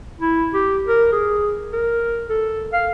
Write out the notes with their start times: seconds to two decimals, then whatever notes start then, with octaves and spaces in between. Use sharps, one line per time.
0.21 E4
0.54 G4
0.87 A#4
1.12 G#4
1.73 A#4
2.29 A4
2.73 F5